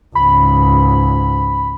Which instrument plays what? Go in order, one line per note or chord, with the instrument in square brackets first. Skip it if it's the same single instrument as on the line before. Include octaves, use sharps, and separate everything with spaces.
[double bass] C#2 G#2 [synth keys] B5